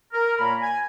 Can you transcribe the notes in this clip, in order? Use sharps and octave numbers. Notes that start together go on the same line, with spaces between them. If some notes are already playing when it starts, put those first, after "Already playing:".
A#4
A#2 A#3 C#5 A#5 B5
G#5